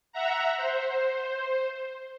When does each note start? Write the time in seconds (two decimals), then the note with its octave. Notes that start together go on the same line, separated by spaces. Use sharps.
0.12 E5 F#5 A#5
0.57 C5